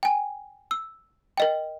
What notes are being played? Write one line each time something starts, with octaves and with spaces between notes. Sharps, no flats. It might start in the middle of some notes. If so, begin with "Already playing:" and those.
G5 G#5
E6
A#4 D#5 G5